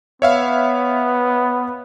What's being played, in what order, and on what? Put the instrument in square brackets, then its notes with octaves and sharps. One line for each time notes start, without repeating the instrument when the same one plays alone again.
[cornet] B3 [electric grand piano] C#5 E5 F5